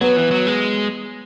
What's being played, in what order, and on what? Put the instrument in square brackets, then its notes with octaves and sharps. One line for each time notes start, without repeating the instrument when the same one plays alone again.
[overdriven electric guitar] F#3 [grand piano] B3
[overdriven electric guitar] E3
F#3
G#3